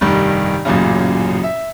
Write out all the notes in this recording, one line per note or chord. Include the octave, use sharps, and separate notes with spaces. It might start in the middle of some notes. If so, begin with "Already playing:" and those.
F1 G2 D#3 G3
A1 F#2 A#2 C#3
E5